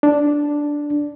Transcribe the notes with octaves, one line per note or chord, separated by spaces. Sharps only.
D4